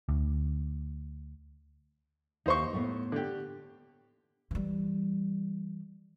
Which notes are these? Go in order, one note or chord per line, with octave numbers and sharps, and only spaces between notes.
D2
D#2 D#4 C5 C#6
A2 A3 B3
D3 G4
E3 G3